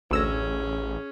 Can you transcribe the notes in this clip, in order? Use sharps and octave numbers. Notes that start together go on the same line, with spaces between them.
A1 D2 C#4 G#4 E6 A#6